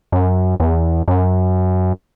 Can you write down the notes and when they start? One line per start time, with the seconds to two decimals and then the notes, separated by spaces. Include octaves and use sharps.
0.12 F#2
0.60 E2
1.08 F#2